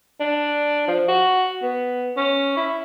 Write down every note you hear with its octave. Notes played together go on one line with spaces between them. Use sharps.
D4
F3
F#4
B3
C#4
E4